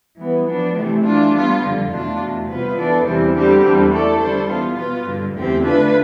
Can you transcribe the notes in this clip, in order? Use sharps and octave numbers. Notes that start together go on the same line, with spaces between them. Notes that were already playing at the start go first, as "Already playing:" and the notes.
E3 G3 B3
F3 B3 D4
C3 E3 A3
E3 A3 D4 F4
G3 B3 F4
F2 D3 G3
E2 B2 A3 D4 F4
E2 B2 A3
C3 G3 B3 F4 B4
E3 B3 D4 A4 D5
E2 C3 E3 G3 C4
D3 G3 C4 G4
E2 D3 G3 C4
A3 E4 A4 D5
D3 G3 D4 A4 C5
E3 B3 F4
B2 B3 F4 B4
G2 D3 G3
E2 D3 A3 C4 G4
D3 A3 D4 F4 B4